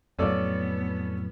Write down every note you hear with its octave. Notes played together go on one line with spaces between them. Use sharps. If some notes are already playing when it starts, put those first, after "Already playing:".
F2 A2 F#3 B3 C#4 A4 D5